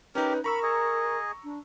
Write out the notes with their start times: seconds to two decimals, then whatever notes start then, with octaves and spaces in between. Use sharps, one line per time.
0.15 C#4 D#4 G4 A#4 B4
0.44 A#4 A#5 B5 C#6 E6
0.63 G#4 D#5
1.44 D4